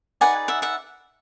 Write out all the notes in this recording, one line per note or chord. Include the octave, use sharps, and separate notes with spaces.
D#4 G#4 B4 D5 F#5 G#5
E5 F#5
E5 F#5